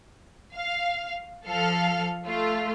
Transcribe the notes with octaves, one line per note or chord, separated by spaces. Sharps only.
F5
F3 A4 F5 F6
A3 F4